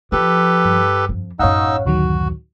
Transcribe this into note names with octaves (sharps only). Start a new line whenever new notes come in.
F3 G4 A4 B4
G2
F2 F3
A1 F#2 D#4 C#5 D#5 F5 F#5 E6
D2 D#3 F#3 F#4